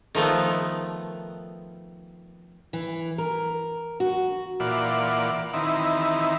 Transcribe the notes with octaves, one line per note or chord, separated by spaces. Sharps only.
D#3 F3 A3 B3
E3
A#4
F#4
A#2 E3 F4 D5 F#5
D#3 E3 C4 D#4 E4